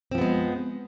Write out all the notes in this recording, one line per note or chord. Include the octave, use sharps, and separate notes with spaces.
F3 G#3 B3 C4